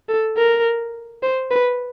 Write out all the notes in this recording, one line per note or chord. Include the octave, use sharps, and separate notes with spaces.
A4
A#4
C5
B4